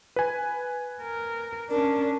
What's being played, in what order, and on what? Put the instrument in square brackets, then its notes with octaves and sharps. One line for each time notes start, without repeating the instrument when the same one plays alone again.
[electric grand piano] B4 G#5
[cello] A#4
[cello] C#4 D4 [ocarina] A#4